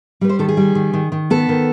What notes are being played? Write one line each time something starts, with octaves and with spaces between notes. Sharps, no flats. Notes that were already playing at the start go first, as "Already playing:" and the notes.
G3 B4
C5
D#3 A4
G#4
G3
D#3
D#3
D#3
B3 A4
D#3